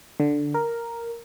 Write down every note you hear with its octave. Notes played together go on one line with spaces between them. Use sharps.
D3
A#4